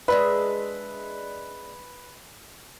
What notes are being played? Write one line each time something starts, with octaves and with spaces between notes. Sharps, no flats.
G#3 D4 B4 E5